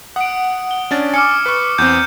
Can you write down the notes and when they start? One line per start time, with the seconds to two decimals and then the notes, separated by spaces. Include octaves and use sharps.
0.16 F#5 D#6 D7
0.71 G7
0.91 C#4 D4 A6
1.14 G#5 D6 F6 C#7
1.46 B4 C#6
1.78 E2 C4 G6